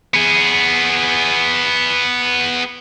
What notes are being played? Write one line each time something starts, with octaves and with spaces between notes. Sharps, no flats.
B3 G#4